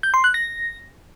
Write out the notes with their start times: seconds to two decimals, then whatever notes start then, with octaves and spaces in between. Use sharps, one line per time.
0.03 G6
0.14 C6
0.24 F#6
0.34 A#6